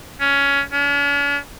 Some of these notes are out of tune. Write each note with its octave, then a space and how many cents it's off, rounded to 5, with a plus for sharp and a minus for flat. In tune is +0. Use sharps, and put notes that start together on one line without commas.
C#4 +15
C#4 +45